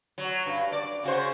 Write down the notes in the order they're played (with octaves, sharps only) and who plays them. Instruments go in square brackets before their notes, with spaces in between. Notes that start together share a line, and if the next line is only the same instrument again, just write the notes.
[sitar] F#3
G2
D5
C#3 F#4 C5